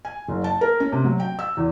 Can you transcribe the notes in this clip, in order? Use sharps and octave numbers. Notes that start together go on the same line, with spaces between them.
G#5
F#1
A5
A#4
C#4
C3
F#3
G5
E6
E2